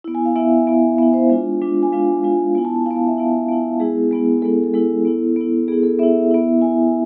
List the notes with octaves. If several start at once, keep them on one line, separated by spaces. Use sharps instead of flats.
B3 E4
G#5
F5
B3 E4 E5
B3 E4
B3 E4 E5
C5
G#3 D4 F4
G#3 D4 F4
G#5
G#3 D4 F4 F5
G#3 D4 F4
B3 E4 G#5
A5
G#5
B3 E4 F5
F5
E5
B3 E4
B3 E4
G#3 B3 E4 G#4
G#3 B3 E4
G#3 B3 E4 A4
A4
G#3 B3 E4 A4
B3 E4
B3 E4
B3 E4 G#4
A4
B3 E4 E5
B3 E4
B3 E4 G#5